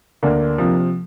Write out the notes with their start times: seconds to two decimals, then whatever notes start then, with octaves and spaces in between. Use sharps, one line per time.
0.23 D2 A#3 D4
0.58 C3 F3